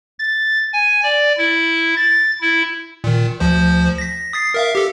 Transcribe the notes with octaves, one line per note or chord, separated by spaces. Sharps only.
A6
G#5
D5
E4
A6
E4
A#2 D#3
D2 F3 C5
A#6 B6
D#6 A6 C7
A#4 E5 F5
G4 A4